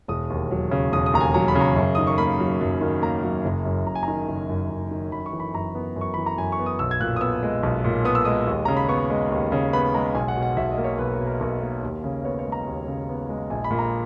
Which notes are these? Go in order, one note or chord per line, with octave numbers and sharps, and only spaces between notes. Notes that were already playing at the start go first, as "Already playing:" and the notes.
E1 D#6
D#2
F#3
C#3
E1 D#6
D#6
D#2 A#5
G#5
F#3 A#5
B5
C#3
A#5
F#2
D#3 D#6
C#6
A#3 B5
F#3
F#2
D#3
A#3 A#5
F#3
F#1
F#2
F#1 A#5
G#5
A#5
D#3
F#1
F#2
F#1
D#3
F#2 B5
C#6
E3
B5
F#2 A#5
B3
F#2
C#6
E3 B5
A#5
F#2 G#5
C#6
B3
D#6
B1 E6
G#6
A#2 F#6
D#6
B3 E6
G#3
B1
A#2
B3 D#6
E6
G#3 D#6
D#2
C#3 A#5
B5
B3 C#6
G#3
D#2
C#3
B3 B5
G#3 A#5
B1 G#5
F#5
B2
F#5
B1 E5
D#5
A#3
C#5
B1 B4
A#4
B2
A#4
B1 A#4
A#3
D#2
C#3
B3 C#5
C#5
G#3
A#5
D#2
C#3
B3
G#3
A#1 G#5
B5
A#2
A#5